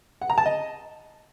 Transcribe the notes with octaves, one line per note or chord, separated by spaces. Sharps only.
F#5
A#5
A5
D#5